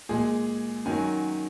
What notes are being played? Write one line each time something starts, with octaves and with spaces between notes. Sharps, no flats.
A#2 G#3 G#4
F#2 D#3 F#3 G#5